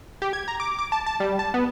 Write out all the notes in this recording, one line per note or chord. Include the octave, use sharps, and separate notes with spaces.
G4
G#6
A#5
D6
D6
A5
A5
G3
A5
B3